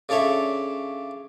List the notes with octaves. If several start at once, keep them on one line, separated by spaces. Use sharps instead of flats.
C#3 D4 A4 C#5 E5